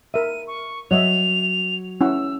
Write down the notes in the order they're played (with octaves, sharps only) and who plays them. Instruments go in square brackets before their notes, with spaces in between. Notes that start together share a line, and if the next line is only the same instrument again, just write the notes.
[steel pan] A#4 E5 [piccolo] D#7
[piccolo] C#6
[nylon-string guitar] F#3 [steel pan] C#5 D#5 E5 [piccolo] F7
[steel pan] C#4 E4 F#5 [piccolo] E6